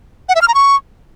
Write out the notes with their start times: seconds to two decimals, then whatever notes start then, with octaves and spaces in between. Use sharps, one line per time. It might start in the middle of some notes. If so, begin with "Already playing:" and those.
0.29 F#5
0.35 E5
0.42 F6
0.48 A#5
0.54 C#6